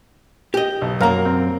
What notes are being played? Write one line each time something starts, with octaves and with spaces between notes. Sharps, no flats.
G4 D#5
B1
F#2 A#3 A#4 F5 A#5
C4